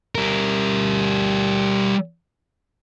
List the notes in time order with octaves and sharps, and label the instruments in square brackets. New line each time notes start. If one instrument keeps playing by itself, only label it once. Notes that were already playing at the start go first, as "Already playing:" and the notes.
[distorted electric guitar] G3 A#4